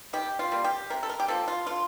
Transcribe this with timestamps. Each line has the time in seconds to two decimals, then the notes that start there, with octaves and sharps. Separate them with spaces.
0.13 D#3 G4
0.39 F4
0.52 G3 A#3
0.64 G4
0.90 C3 A#4
1.03 A4
1.09 A#4
1.20 G4
1.28 F3 A#3 A4
1.48 F4
1.66 D3 F4